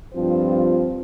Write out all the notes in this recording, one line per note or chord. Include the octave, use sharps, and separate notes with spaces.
G2 F3 C4 F4 C5